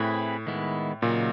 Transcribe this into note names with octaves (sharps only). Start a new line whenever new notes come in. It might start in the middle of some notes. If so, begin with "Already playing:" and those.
Already playing: A2 C4 E4 G#4 B4
D#3 G#3 B3 E4
A#2 C#3 F#3 A#3 D#4